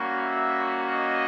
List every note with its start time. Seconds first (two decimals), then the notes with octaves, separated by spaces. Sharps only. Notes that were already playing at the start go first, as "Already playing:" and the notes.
Already playing: G3 A#3 C#4 F#4
0.21 E5
0.89 D#5